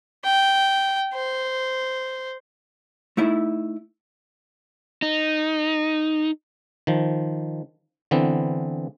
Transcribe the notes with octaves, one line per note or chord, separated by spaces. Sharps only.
G5
C5
A3 D#4 E4 E5
D#4
D#3 F3
D3 E3 B3 C4